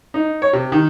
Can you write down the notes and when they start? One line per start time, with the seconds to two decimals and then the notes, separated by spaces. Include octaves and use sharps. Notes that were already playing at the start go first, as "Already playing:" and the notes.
0.14 D#4
0.42 C#5
0.53 C3
0.72 D#3